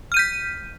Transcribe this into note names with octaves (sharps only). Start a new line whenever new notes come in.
F6 G6 B6 D#7